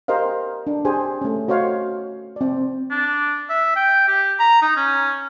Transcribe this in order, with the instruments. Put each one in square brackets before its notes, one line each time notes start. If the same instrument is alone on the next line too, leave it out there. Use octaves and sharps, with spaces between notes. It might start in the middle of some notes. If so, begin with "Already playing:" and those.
[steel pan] G4 A#4 C5 D#5 F5
D4
G4 G#4 C5 G#5
A3 C#4
F#4 C5 C#5 D#5 F5
C4 D5
[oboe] D4
E5
G5
G4
A#5
D#4
C#4